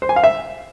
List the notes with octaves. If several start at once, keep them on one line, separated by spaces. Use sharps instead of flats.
C5
G#5
F5
E5